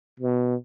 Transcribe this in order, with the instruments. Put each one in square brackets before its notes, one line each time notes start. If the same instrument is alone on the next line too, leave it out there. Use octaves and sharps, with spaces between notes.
[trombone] B2